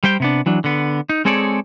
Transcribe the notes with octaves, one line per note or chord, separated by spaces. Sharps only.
G3 G4 C5 G5
C3 B3 D4
E3 F#3 D4
D3 B3
D#4
G#3 C4 G#4 A4 C#5 D5